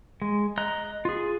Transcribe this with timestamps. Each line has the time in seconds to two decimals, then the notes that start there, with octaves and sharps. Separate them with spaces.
0.22 G#3
0.58 D#5 A#5 F#6
1.05 F4 G#4